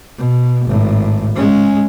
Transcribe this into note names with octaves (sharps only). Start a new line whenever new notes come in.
B2
G#1 A2
G#3 C#4